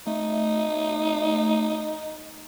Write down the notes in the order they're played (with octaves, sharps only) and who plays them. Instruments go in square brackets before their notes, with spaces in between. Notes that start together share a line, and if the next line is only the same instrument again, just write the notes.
[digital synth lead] A3 [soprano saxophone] D#4